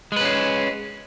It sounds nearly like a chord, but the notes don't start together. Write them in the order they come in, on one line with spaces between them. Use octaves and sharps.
G#3 B4 C#4 G#4